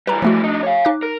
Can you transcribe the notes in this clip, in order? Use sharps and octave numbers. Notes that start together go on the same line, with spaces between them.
E3 G3 B4 A#5
F3 A3 F#4
D4 D#4
C#5 F5
D#4 D6 F#6
A#4